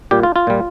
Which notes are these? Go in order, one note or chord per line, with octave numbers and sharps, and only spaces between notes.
A#2 G3 G4
F4
F4
A#2 G3